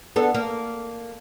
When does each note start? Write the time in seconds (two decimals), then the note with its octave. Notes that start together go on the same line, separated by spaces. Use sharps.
0.16 B3 D4 A4
0.34 A#3